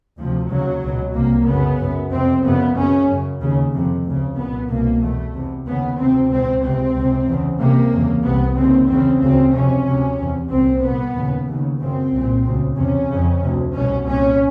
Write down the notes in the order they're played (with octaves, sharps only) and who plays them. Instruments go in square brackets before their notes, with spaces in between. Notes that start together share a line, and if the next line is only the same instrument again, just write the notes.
[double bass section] D2 C3 F3
D#2 C#3 F#3
C#2 B2
C2 C3 A#3
F#2 C#3 B3
F#2 C#3
F2 C3 C4
F#2 C#3 B3
F#2 C#3 C#4
F#2 C#3
D#2 C#3
F2 C3
D2 C#3
C2 A#2 B3
C2 B2 A#3
E2 B2 A3
E2 C3
D#2 C#3 B3
D2 C3 C4
C#2 B2 C4
C#2 C3 C4
C#2 C3
E2 C#3
C#2 C3 A#3
E2 C#3
C2 C3 B3
D#2 C#3 C4
E2 C#3 C4
D2 C#3 C4
F2 C3 C#4
D2 C3
E2 C3
C2 A#2 C4
C2 A#2 B3
D#2 C#3
D#2 C#3
F#2 C#3 C4
C2 A#2
D2 C#3
E2 C3 C#4
F2 C#3
D2 C3
C2 B2 C#4
C2 A#2 C#4